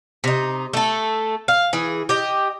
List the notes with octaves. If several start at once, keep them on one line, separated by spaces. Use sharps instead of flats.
C3 D#4
A3 A4
F5
E3 G#4
G4 D#5